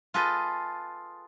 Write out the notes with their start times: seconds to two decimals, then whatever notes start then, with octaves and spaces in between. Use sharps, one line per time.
0.14 F4 G#4 A4 B4 D#5